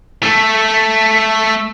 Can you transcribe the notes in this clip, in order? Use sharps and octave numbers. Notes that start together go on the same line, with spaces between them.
A3 A4